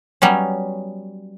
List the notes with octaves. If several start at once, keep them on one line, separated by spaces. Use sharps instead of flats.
F#3 G3 B3 C#4